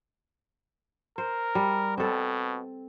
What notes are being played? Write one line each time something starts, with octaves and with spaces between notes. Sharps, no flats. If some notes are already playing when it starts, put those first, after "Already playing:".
A#4 C5
G3
B2 C4 A4